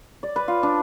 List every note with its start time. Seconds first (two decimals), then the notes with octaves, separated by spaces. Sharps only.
0.23 D5
0.36 B4
0.48 F4
0.63 D4